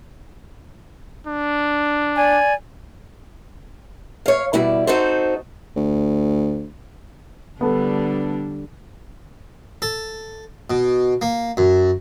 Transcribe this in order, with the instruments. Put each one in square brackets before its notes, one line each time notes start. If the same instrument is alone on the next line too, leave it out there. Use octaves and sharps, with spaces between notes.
[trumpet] D4
[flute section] D5 G#5
[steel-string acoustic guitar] C#5 F5
B2 G3 E4 D5
C4 D#4 F#4 A4 C5
[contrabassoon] D2
[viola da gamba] D3 G3 D4 [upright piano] B3 A4
[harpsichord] A4
B2
A#3
F#2